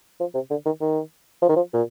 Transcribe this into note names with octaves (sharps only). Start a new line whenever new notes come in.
F3
C3
D3
D#3
D#3
F3
D#3
F3
A#2